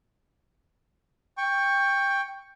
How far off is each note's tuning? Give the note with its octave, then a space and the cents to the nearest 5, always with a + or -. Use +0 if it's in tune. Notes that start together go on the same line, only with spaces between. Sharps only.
G5 +15 C#6 +0